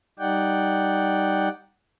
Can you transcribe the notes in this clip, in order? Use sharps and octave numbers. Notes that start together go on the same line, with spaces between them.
G3 D#4 D5 F#5 G5